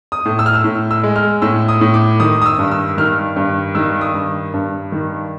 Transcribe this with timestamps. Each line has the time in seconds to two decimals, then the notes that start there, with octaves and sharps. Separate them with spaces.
0.12 D#6
0.25 A2
0.39 E6
0.46 F6
0.54 E6
0.64 A2
0.91 E6
1.03 G#3
1.16 F6
1.42 A2 E6
1.69 D#6
1.81 A2
1.94 D6
2.20 D#3 D#6
2.42 D#6
2.46 E6
2.58 G2
2.71 E6
2.97 D#3 F6
3.36 G2
3.75 D#3 E6
4.01 D#6
4.14 G2
4.54 G2
4.92 D#3